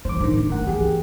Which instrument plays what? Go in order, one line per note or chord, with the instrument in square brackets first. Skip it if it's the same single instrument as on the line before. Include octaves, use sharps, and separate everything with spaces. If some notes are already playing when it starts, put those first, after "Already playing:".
[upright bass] G2 E3 [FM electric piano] C5 D6
[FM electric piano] F2 A2 D#3 [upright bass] D3 D4
[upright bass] A3
[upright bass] G1 [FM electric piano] A#4 F#5
[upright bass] E3 B3 [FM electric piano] G4 G#4